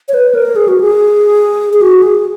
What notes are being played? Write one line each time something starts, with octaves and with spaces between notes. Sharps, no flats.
C#5
B4
A#4
G#4
F#4
G#4
G#4
F#4
G#4